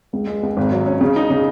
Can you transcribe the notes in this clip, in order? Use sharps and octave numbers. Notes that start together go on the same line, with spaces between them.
C#2
G#3
C#2
G#1
F#3
C#4
C#3
D#4
C#3